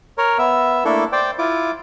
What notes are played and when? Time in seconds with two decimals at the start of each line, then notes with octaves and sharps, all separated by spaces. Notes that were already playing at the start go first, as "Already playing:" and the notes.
0.18 A#4 C#5
0.38 B3 E5
0.85 A3 A#3 D4 E4 A4
1.12 C5 D5 G5
1.38 E4 F4 D6